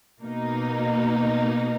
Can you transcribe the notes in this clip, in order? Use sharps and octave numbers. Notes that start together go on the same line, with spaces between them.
B2 A#3 D#4